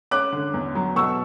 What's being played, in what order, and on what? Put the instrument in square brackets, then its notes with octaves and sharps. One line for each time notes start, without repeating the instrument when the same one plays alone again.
[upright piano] C#4 D6 F#6
D3
E2
F#3
B2 C#6 E6